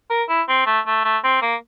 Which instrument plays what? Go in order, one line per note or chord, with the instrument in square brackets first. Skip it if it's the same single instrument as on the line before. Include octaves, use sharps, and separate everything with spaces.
[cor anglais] A#4
E4
C4
A3
A3
A3
C4
A#3